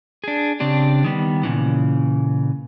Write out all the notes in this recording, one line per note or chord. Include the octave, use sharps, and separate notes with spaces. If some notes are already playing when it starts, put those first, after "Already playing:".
D4 G#4
C#3 C4 D4 G4
D#3 G3 B3
A#2 C#3 E3